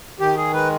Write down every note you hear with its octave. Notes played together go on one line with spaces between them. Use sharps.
D#3 G4
G#4
G#3 B4